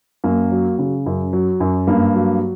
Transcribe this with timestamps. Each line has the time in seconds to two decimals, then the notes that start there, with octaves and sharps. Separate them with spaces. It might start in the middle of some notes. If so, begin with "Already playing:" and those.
0.24 F#2 A#3
0.51 F#3
0.79 C#3
1.06 F#2
1.33 F#3
1.60 F#2
1.87 G2 A#3
2.14 F#3